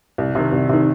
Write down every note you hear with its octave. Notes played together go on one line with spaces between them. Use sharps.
C2
C3 D#3
C2
C3 D#3